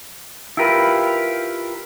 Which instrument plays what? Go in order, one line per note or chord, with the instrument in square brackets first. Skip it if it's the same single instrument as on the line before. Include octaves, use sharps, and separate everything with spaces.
[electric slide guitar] E4 F4 G4 A#4 B4